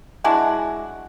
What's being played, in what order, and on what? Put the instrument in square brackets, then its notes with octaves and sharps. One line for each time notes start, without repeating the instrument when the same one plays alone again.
[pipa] G#3 D4 E4 F#4